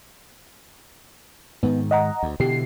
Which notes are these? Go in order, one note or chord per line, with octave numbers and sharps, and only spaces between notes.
G#2 D#3 B3
D#5 F#5 A#5
D2
B2 D3 E3 G4 C7